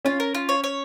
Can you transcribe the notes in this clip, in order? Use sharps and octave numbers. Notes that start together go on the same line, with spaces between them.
C#4 F4
A#4
F4
C#5
C#5